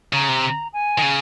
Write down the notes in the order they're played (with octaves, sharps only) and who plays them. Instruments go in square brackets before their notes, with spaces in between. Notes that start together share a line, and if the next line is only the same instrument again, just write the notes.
[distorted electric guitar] C#3 [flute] A#5
[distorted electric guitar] C3
[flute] G#5
[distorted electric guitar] D#3
C#3